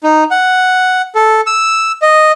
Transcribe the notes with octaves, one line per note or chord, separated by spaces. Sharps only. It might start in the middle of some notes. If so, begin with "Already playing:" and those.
D#4
F#5
A4
E6
D#5